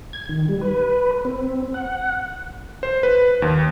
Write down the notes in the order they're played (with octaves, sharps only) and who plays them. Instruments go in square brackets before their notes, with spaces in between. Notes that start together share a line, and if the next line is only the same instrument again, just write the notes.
[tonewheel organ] G#6
D#3
G3
B4
C4
F#5
[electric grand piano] C5
B4
D#2